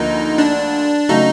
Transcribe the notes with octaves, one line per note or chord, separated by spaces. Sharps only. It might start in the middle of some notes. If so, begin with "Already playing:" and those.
Already playing: D2 D3 F3 A#3 D#4
D4
C#3 F#3 A3 D#4